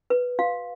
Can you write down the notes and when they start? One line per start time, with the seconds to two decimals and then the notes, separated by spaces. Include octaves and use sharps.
0.10 B4
0.39 F#4 F5